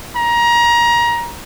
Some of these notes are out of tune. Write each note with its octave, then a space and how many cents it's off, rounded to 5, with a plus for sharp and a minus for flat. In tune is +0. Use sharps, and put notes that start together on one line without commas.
A#5 +25